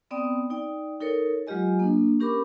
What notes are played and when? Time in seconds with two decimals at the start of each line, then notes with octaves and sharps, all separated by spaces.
0.11 B3 C4 D5 G5 D#6
0.50 D#4 D5 G5
1.00 D#4 A4 A#4 C#5
1.47 F#3 G#3 F4 G4 D#5 G#5
1.79 A#3 D4
2.20 C#4 G4 A#4 B5 D6